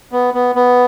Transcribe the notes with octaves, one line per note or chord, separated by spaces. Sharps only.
B3
B3
B3